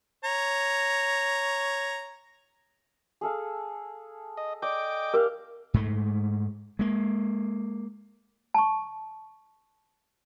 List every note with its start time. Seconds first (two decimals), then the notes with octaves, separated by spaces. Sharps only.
0.24 C#5 A#5
3.21 G#4 A4 F5
4.37 D#5
4.62 D5 D#5 G5 D6
5.14 G4 A#4 D5 F5
5.74 G#2 G#3 A3
6.79 G#3 A#3
8.54 A5 C#6